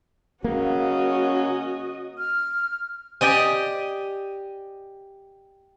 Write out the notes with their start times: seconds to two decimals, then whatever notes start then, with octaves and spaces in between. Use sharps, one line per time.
0.44 C#3 F#3 A#3 C#4 F#4 D#5
2.18 F6
3.21 G4 D5 D#5 G#5